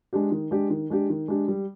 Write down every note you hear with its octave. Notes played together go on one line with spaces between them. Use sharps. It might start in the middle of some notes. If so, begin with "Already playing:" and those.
G#3 D4 G4
D#3
G#3 D4 G4
D#3
G#3 D4 G4
D#3
G#3 D4 G4
G3